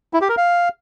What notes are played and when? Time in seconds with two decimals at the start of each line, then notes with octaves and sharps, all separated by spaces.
0.13 E4
0.21 G4
0.29 A#4
0.37 F5